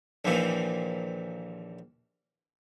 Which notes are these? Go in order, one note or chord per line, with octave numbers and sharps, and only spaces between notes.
A#1 D#2 A#2 E3 F3